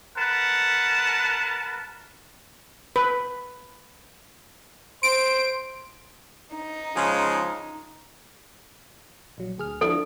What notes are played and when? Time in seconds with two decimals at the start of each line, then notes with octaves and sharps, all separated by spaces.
0.17 A#4 B4 F#5 A5
2.96 B4
5.03 C5 D7
6.57 D#4
6.95 C#3 F3 G#3
9.38 A#1 F#3
9.58 D2 G#4 F6
9.81 F3 D4 E4 A4